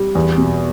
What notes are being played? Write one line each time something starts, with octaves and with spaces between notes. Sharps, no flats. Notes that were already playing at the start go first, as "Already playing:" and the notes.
Already playing: G3
E2
B2